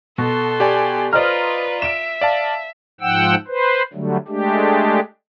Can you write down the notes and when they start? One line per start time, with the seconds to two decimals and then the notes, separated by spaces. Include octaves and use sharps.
0.18 B2 A4 C6
0.60 G4 D5 G#5
1.13 F4 B4 C5 D5 D#5 A#5 F6
1.82 E5 D7 E7
2.21 D5 F5 A5
3.01 G#2 F3 F#5 G5 E6
3.48 B4 C5
3.93 D3 F#3 G3 A3
4.28 G#3 A3 D4 G4